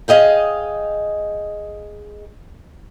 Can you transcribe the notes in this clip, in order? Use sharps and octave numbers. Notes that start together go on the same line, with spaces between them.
G#4 D#5 F5 G5